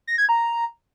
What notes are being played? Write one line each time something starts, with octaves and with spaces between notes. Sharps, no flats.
A#6
G#6
A#5